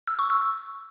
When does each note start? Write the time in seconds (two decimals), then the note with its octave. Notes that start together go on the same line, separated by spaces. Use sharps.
0.07 E6
0.19 C#6
0.30 E6